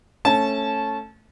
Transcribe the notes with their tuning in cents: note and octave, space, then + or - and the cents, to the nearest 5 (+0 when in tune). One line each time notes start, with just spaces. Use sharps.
A3 +0 C#4 -20 A5 -20